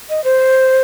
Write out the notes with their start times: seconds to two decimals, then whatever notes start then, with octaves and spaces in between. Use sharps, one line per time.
0.09 D#5
0.24 C5